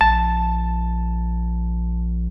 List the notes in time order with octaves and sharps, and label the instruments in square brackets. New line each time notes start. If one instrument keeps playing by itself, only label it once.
[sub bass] A#1 [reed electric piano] A5